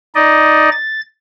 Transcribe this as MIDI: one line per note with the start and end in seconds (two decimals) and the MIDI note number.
0.15 0.69 63
0.15 0.69 74
0.15 0.69 75
0.72 1.01 93